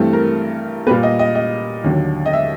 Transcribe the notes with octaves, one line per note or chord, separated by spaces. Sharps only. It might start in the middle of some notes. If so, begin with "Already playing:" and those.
Already playing: G2 E3 A3 C4
A#4
A#2 G3 A#3 B4
D#5
D#5
D#5
D#2 D3 F#3
D#5
E5